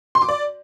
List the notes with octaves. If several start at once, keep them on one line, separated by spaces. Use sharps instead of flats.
C6
D6
D5